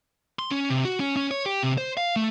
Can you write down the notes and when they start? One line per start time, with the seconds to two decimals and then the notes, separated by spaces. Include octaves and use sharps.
0.39 C6
0.51 C#4
0.70 C3
0.85 F#4
1.00 C#4
1.16 C#4
1.31 C#5
1.46 G4
1.63 C3
1.78 C5
1.97 F5
2.16 A3